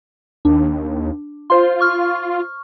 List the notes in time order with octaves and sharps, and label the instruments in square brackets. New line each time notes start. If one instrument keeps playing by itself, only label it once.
[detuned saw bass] D#2 [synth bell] D4
[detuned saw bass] F4 [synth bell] C5 C6
[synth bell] C#6 F6